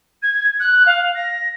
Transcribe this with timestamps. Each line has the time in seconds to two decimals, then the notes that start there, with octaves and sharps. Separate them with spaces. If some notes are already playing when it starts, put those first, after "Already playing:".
0.22 G#6
0.59 F#6
0.85 F5
1.15 A#6